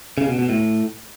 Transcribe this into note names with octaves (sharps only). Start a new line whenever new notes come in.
C#3
B2
B2
A2